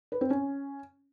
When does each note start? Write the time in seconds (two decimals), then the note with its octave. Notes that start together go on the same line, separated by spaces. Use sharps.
0.12 B4
0.21 C4
0.30 C#4